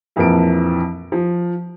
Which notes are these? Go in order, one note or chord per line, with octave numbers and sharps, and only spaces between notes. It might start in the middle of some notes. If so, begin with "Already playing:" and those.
A#1 F2 E3 A#4 A5 D7
F3